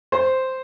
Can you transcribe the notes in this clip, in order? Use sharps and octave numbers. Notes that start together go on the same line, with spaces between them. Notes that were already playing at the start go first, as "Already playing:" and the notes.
C5